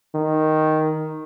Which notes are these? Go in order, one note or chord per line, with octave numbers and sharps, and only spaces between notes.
D#3